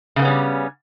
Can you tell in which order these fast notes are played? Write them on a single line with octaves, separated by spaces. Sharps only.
C#3 A#3 B3 C#4 G3